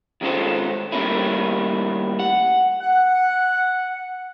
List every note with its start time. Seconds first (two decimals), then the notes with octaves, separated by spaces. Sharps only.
0.21 D#3 G#3 C#4 F4 A4 C5
0.92 D#3 G3 A3 A#3 C#4 E4
2.19 F#5
2.81 F#5